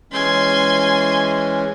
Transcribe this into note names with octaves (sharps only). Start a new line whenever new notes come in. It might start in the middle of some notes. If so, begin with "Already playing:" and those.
E3 G#3 C#4 G#5 C6